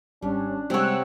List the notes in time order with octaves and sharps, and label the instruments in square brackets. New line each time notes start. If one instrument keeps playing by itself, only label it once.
[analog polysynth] G#1 C#4 [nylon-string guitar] G3 [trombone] D4
[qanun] C3 C#5 [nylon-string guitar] G3 G#3 [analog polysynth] F#5 E6 F#6